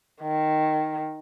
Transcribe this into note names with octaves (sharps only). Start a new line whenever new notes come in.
D#3